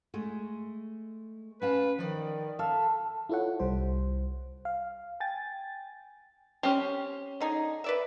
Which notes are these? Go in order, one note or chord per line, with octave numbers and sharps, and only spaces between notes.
G#3 A3
C#4 B4 F5 A5
D#3 F3 D5
A4 E5 F5
E4 F4 A4 C#5 F#5
C2 G3 C5
F5
G5 G#5 A6
C4 C#4 G4
D3 D#4 G#4
B4 D5 E5